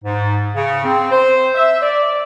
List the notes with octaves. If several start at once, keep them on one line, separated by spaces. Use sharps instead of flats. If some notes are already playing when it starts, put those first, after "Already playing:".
G#2
C#3
C4
C5
E5
D5